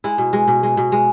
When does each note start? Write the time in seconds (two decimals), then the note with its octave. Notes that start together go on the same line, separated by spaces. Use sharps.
0.04 G#3 E4
0.18 B2
0.33 G#3
0.48 B2
0.63 G#3
0.77 B2
0.92 G#3